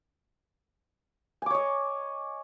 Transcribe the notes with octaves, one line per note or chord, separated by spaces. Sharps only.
C#5 D#5 G#5 D6